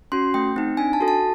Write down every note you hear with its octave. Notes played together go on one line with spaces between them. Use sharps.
C#4 F#4 C6
A3 G5
C4 D#4
D4 G#5
A5
F#4 A4
A5